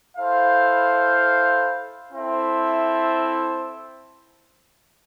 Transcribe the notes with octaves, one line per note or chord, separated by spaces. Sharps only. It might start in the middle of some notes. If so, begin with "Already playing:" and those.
E4 A4 C5 F5
C4 E4 A4 C5 E5